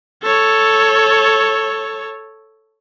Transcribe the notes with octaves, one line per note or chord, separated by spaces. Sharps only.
A4 C#5